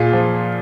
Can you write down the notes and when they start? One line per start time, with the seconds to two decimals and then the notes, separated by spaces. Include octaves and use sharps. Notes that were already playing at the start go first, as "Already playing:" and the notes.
Already playing: A#2 F4 G#4
0.13 F3